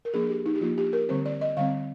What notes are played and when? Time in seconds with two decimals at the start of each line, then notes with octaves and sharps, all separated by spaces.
0.05 A#4
0.14 F3 A#3 D4 G#4
0.29 G4
0.46 D#4
0.55 G4
0.61 F3 A#3 D4 F4
0.78 G4
0.93 A#4
1.09 D3 G3 C4 C5
1.26 D5
1.41 D#5
1.57 D3 G3 C4 F5